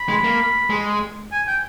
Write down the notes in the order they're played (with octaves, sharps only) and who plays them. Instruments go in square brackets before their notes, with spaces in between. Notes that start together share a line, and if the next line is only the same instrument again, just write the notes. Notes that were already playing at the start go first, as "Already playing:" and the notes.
Already playing: [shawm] B5
[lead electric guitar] G#3
A#3
G#3
[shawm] G#5
G5